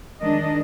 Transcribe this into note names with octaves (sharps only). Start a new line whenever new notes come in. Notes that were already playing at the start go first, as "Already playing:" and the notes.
D#3 G#3 D4 D#5